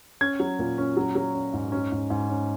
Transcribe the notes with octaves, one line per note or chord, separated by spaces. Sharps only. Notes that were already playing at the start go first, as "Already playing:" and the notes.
C#4 G#6
F#3
A#2
C#4
F#3
F#3
C#4
G#2
C#4
G#2
G#2
C#4